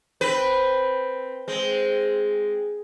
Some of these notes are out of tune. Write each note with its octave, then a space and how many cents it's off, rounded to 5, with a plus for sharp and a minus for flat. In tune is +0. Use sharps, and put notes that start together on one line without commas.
C4 +0 B4 +0
G#3 +0 C4 +0